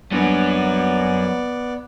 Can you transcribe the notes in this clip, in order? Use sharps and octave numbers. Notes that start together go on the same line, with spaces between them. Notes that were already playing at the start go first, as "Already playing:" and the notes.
F#2 G3 A#3 B3 C#4 D4 D5